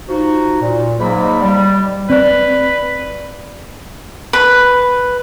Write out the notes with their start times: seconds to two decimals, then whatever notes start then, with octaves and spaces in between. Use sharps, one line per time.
0.09 F3 D#4 F#4
0.61 A#2
1.00 G#2 F#3 A#3 B5
1.42 G3
2.10 C4 B4 D5 F#6
4.33 B4